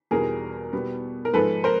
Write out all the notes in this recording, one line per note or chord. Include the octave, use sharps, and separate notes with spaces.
E2 B2 G3 G#4 A#4
B2 G3 B3
A#4
G#2 F3 G#3 A4 B4
A#4 C5